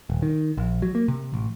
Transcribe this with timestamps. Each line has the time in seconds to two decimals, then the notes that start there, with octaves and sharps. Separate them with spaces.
0.10 D#1
0.22 D#3
0.57 A#1
0.82 F#3
0.95 A#3
1.08 C3
1.34 A1